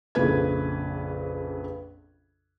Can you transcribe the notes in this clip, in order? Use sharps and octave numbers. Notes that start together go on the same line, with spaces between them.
A#1 F2 C#3 B4 G#6